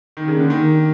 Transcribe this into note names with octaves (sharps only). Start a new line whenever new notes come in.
D#3 A#3 D4 G4
C#3
D3
D#3